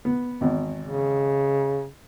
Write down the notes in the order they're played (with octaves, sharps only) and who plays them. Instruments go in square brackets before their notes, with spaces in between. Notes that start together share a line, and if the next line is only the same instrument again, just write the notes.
[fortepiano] B3
G#1 E2
[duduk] C#3